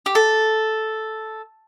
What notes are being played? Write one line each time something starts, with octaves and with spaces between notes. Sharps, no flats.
G4
A4